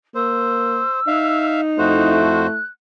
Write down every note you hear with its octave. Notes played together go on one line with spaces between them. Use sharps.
A#3 C5 E6
D#4 E5 F5
F2 A3 E4 F#4 C5 F#6